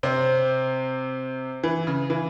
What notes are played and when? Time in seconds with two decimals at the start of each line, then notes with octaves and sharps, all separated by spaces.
0.03 C3 C4
1.63 E3
1.87 C#3
2.10 E3